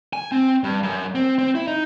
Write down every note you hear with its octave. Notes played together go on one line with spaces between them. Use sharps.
G#5
C4
G2
F#2
C4
C4
E4
D#4